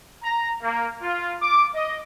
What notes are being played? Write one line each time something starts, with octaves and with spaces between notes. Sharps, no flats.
A#5
A#3
F4
D6
D#5